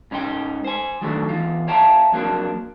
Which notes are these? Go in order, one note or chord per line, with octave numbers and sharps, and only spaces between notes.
G#2 C#4 D#4 A4 G5
C5 G#5
D#3 F#3 G#3 A3 D4
E2 F4
C#5 E5 F5 G5 A5 A#5
F2 F#3 A#3 D4